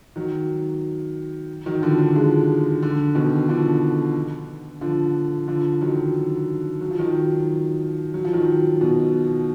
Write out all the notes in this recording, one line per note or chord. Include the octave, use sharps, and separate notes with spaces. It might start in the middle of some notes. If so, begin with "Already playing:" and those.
D#3 F#3
D#3 F#3
D3 F3
D3
F3 G#3
D3
B2 D#3
D3 F3
D3 F3
D3 F3
D#3 F#3
F#3
F3
D#3 F#3
F#3
F3
D#3 F#3
B2